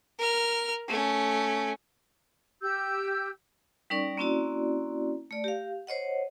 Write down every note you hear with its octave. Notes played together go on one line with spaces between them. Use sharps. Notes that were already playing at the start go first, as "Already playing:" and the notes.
A#4 F6
A3 C#4
G4 E6 G6
G3 C#4 D#4 A#4 D5 C#6
A#3 C4 C#4 E4 F#4 D5
A3 D5
G4 F5
C5 C#5 D#5 F#5